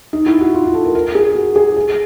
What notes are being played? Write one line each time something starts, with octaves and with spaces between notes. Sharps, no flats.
D#4
E4
F#4
F4
E4
A4
A#4
A#4
G#4
F#4
G#4
G#4